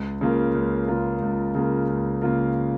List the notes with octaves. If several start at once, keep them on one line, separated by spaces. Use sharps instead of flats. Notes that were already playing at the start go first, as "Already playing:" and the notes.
Already playing: C#2
C#3 A#3 F4 A#4
C#2
C#3 A#3 F4 A#4
C#2
C#3 A#3 F4 A#4
C#2
C#3 A#3 F4 A#4